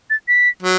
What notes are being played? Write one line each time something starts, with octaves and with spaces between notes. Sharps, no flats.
A6
B6
F#3